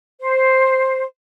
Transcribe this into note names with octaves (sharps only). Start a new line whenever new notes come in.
C5